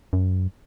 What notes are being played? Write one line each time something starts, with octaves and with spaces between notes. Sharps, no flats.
F#2